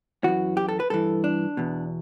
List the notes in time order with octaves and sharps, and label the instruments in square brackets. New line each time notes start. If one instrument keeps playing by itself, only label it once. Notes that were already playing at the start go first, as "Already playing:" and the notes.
[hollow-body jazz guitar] F#2 E3 F#4
G4
A4
B4
G2 E3 A4
D4
E2 B2